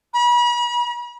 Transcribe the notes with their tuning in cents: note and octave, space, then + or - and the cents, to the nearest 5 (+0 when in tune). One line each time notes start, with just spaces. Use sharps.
B5 -40